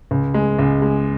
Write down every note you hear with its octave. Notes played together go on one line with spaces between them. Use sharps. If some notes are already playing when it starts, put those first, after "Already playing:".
C#2
G#3
C#2
G#3